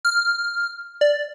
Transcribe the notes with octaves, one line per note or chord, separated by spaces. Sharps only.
F6
D5